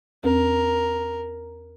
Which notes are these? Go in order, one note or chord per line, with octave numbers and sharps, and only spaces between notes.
E2 C4 A#4